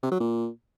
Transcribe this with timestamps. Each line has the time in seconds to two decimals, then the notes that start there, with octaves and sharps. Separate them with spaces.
0.03 C3
0.12 F#3
0.20 A#2